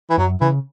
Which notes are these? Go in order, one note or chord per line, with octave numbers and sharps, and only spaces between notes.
E3
F#2 F#3
C#3 E3